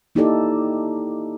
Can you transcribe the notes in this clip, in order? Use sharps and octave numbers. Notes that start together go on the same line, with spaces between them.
A#3 D#4 E4 G4 A4 D5